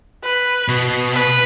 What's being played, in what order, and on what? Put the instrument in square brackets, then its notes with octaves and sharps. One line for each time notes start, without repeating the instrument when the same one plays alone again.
[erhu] B4
[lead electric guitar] B2
[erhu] B4